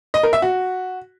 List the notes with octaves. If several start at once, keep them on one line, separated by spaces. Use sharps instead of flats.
D#5
A#4
E5
F#4